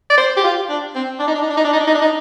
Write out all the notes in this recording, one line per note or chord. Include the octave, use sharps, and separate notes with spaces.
D5
C5
G4
F4
D4
C4
D4
D#4
D4
D#4
D4
D#4
D4
D#4
D4
D#4
D4
D#4